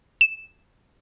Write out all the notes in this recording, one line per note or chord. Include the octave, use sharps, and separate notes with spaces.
E7